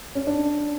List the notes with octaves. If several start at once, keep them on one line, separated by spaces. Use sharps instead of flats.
C#4
D4